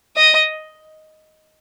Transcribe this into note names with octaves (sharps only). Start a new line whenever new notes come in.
D#5